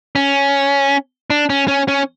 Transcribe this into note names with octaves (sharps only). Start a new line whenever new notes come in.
C#4
D4
C#4
C#4
C#4